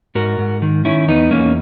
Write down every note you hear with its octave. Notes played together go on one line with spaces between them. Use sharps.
G#2 F#4 A#4
G#2
D#3
D#3 C#4 E4
E2 B3 D#4
E2 A#3 C#4